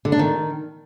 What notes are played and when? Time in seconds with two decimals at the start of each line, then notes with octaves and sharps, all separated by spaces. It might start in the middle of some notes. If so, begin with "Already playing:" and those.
0.05 D3
0.12 D4
0.19 D#3